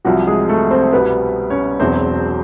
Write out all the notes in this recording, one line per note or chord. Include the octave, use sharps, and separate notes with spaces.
C2 C3 F3 F#3 F#4
G#3 G#4
A3 A4
C4 C5
C2 B2 G3 B3 B4
C#4 C#5
E1 E2 B2 F#3 C4 C5